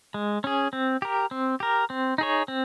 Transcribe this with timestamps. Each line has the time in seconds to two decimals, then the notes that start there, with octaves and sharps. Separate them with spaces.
0.14 G#3
0.44 C#4 G#4
0.73 C4
1.02 G4 A#4
1.31 C4
1.60 G4 A#4
1.90 C4
2.18 D#4 G#4 C#5
2.48 C4